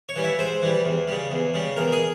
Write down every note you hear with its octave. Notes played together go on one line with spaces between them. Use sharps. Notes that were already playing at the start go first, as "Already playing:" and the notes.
C#5
E3 G3
E5
G#2 C5
E3 G3
E2
C#3 G3
E2
C#3 G3
E2 A#4
G#4